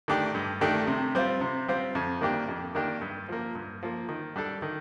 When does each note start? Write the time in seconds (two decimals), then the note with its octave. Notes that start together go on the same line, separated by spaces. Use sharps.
0.08 D#3 A3 D4 G4
0.35 G2
0.61 D#3 A3 D4 G4
0.87 C3
1.15 G3 C4 F4
1.41 C3
1.68 G3 C4 F4
1.95 F2
2.21 D#3 A#3 D4 G4
2.48 F2
2.75 D#3 A#3 D4 G4
3.01 G2
3.28 F3 A#3
3.55 G2
3.83 F3 A#3
4.09 D#3
4.36 G3 D4 A4
4.62 D#3